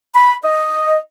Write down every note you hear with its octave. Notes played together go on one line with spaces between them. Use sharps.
B5
D#5